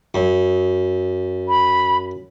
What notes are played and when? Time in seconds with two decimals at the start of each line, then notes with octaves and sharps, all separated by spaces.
0.14 F#2
1.49 B5